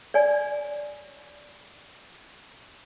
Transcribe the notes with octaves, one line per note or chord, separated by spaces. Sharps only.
C#5 D5 G#5